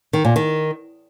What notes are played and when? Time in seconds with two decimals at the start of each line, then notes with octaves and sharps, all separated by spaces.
0.13 D#3
0.25 A#2
0.36 D#3